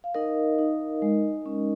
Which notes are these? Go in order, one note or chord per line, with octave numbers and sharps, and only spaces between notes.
F5
D#4 A#4 D#5
D#4
G#3
C#4